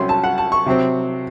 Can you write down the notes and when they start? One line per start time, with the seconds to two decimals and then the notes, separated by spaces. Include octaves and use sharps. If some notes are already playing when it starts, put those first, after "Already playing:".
Already playing: C2 C3 F#3 C#4 C6
0.09 A5
0.24 F#5
0.38 A5
0.52 C#6
0.66 C3 F#3 C4